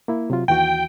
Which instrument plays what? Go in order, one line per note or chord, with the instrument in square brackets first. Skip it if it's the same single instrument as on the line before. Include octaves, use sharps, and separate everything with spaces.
[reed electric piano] A#3 E4
C3 F#3 F4
[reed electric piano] D#2 E3 F#4 [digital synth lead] G5